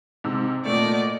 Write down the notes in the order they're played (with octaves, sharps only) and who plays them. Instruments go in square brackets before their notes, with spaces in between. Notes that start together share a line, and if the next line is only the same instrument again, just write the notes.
[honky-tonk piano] G#2 C3 E6
[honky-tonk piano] G#1 A#2 A3 [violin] D5 D#5